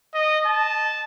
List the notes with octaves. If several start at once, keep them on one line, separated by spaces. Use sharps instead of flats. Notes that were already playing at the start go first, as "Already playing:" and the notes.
D#5
A5